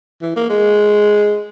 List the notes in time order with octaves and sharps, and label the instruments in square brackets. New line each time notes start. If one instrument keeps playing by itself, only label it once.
[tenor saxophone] E3
A#3
G#3